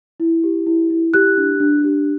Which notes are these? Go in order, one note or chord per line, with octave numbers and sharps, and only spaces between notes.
E4
G4
E4
E4
G4 F#6
D4
D4
G4